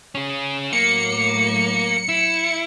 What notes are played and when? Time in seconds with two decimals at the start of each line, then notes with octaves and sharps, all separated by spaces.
0.15 C#4 G#4
0.73 A2 F#3 A#3 C#7
2.09 E4